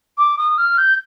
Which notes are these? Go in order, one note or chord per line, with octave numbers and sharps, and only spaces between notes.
D6
D#6
F6
G6